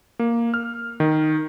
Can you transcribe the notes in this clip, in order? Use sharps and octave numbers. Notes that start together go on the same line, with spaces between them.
A#3
F6
D#3